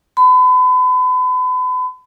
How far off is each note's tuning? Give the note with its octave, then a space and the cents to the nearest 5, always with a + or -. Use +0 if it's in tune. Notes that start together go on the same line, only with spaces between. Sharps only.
B5 +35